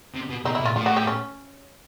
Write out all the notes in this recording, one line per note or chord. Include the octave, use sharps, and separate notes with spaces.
C3
B2
B2 D#4
E4
A#2
F4
A2 F4
F#4
G4
C#4